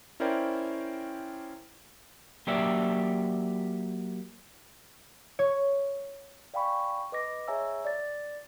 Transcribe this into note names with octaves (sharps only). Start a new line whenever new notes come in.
C#4 E4 A#4 C5 D5 G5
F#3 A#3 G4 D5 E5
C#5
D5 F5 G5 G#5 B5 C#6
B4 D#5 D6 A#6
G#4 C#5 E5 G#5 A#5 E6
D5 A6